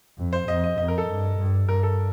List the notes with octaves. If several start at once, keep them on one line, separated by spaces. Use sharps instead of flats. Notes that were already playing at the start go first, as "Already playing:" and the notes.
F2
C5
F2 D#5
D#5
F2 D#5
A#4
A4
G2
G2
G2 A#4
A4